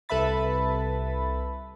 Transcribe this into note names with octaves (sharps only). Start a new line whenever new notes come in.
C2 A4 B4 E5 B5 A6